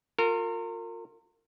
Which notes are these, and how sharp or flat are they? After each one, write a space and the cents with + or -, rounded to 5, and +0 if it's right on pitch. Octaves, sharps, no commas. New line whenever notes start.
F4 +25 A#4 -30